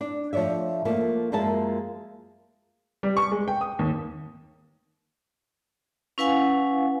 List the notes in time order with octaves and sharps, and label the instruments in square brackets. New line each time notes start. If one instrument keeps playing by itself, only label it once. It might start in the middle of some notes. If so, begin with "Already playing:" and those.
[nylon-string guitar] D4
F3 A3 C#5 D5 E5
F3 A3 A#3
F#2 F3 G#3 A#3 E5 A5
[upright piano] G3
C#6
G#3
G5
D#6
D#2
[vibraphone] C#4 E4 B4 F5 F#5 G#5